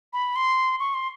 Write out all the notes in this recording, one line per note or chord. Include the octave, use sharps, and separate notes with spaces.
B5
C6
C#6
C6